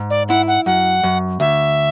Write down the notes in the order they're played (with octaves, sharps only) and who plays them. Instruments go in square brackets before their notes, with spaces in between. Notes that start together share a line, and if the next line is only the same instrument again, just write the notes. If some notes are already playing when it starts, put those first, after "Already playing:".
Already playing: [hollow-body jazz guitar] G#2
[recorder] D5
[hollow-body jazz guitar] E4 [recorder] F#5
[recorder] F#5
[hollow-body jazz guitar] F#2 [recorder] F#5
[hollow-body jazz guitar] F#2
[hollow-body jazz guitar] D2 [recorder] E5